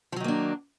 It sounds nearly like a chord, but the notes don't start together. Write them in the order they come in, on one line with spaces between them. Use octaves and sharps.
F3 F#3 D#3 A#3 D4